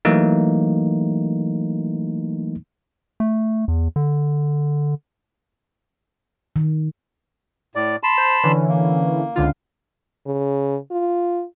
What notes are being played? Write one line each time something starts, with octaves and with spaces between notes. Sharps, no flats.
E3 F#3 A3 A#3 D#4
A3
E2
D3
D#3
A2 D5
A5 B5 C6
C5
D3 E3 C#4
A#3
C#2 D3 F4
C#3
F4